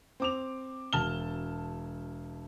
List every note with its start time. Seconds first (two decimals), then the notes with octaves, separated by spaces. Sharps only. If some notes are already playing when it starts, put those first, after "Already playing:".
0.20 C4 D6 F7
0.93 E1 A5 F6 G7